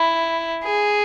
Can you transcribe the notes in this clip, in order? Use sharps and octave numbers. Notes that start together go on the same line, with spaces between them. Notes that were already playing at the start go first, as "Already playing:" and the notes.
Already playing: E4
G#4